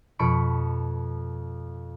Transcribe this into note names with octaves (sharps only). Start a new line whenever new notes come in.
F2 B2 B5 C#6 D7